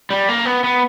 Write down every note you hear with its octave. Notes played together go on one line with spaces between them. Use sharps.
G3
A#3
B3
B3